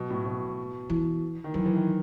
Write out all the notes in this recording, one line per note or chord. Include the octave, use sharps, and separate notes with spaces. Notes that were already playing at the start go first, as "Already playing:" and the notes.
Already playing: B2 F#3
A2
B2
E3
D#3
E3 F#3
E3
D#3